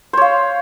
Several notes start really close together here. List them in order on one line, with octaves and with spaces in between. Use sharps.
C5 C#5 F5